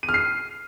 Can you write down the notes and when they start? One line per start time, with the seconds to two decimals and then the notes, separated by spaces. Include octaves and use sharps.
0.03 D#7
0.09 F6
0.14 C7